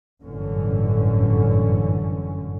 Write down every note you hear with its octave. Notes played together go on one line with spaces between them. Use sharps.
G1 F#2 A2 D3 E3 C#4